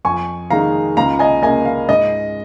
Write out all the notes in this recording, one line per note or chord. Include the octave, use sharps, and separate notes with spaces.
F2 G#5 C#6
D#3 G#3 F5 A#5
C#2 F5 A#5
D#5 G#5
C#3 A#3 D#5 G#5
F5
G#2 D#5